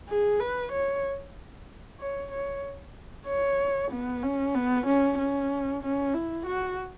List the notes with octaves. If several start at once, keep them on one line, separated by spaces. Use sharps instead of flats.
G#4
B4
C#5
C#5
C#5
C#5
B3
C#4
B3
C#4
C#4
C#4
E4
F#4